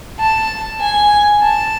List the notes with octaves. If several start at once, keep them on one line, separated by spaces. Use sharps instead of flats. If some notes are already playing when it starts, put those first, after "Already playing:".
A5
G#5
A5